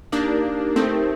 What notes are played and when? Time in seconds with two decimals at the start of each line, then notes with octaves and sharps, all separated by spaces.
0.12 A#3 D4 D#4 G4 A#4
0.76 A3 C4 D#4 G4 A#4